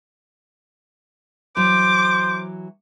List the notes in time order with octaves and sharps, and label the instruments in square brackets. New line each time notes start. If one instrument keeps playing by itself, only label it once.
[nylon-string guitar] E3 F#3 [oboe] C5 [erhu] D6